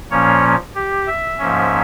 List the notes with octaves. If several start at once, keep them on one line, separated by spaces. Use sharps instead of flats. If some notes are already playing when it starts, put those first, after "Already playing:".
A#2 F3 A#3 C#4 C#5
G4
E5
G#2 F3 A#3 C#4